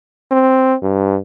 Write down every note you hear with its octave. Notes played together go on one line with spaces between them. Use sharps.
C4
G2